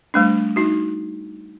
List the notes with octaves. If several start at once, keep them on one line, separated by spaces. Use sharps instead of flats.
G3 A3 D4
D#4 F#4